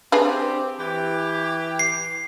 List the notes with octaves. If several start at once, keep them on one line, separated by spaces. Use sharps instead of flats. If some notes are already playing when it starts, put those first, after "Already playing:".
C4 D4 G4 G#4 B4
E3 G4
C7